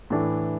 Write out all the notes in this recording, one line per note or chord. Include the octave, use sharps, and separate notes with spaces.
A2 E3 A3 D4